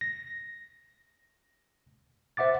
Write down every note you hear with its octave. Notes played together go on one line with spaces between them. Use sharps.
A#6
C5 E5 F#5 D6 A6